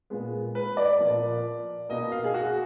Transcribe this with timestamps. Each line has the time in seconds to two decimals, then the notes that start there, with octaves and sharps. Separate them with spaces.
0.10 A#2 G#3 B3
0.55 B4
0.77 D5
1.00 A#2 F3 A#3
1.89 B2 A#3 D#5
2.12 F5
2.24 G#4
2.34 F#4